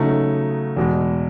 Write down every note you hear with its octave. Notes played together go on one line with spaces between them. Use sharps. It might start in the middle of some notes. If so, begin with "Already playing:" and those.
Already playing: C#3 F#3 A3 D#4
E2 B2 G#3